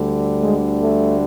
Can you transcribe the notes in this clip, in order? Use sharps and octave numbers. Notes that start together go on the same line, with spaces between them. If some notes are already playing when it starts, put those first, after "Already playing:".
Already playing: D2 D3 G3
G#3
A3